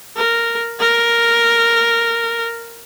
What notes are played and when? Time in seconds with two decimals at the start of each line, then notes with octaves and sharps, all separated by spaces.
0.17 A#4
0.80 A#4